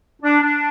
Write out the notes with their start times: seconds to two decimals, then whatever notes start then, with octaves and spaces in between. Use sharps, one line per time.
0.22 D4
0.42 D4